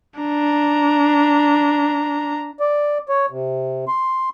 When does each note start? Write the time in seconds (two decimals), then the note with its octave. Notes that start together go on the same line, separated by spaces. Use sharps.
0.20 D4 A#5
2.60 D5
3.09 C#5
3.30 C3
3.88 C6